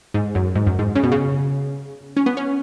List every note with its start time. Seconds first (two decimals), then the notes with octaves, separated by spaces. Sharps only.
0.14 G#2
0.35 F#2
0.55 G#2
0.66 F#2
0.79 G#2
0.95 C#3
1.03 B2
1.12 C#3
2.16 C#4
2.26 B3
2.37 C#4